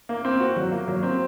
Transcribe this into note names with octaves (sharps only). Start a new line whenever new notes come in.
A#3
C4
F#4
F#3
A#3
F#3
C4